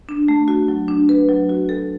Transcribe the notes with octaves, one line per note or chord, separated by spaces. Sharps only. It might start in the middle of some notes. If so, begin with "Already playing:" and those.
D4
A3
F#4
F#3
D4
B4
F#3
F#4
A4